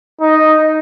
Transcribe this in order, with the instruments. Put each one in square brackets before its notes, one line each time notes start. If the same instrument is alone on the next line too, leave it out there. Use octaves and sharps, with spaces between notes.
[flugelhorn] D#4